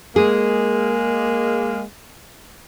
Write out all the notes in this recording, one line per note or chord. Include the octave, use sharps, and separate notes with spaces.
G#3 A#3 G#4